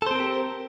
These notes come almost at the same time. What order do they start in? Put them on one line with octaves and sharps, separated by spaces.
A4 C5 C4 A#4 G4